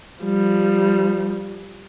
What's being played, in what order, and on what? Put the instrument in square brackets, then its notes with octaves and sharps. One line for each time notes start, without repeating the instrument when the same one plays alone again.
[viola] F3 G3